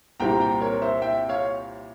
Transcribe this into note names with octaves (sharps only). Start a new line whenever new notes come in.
C2 A#2 G3 C4 G5 A#5
G5 A#5
A#4 C#5
C5 E5
E5 G5
C#5 F5